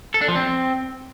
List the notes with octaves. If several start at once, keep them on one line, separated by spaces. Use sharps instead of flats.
A4
D4
F3
C4